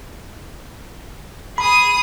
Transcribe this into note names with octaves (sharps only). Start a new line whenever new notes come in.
G#4 B5 D#6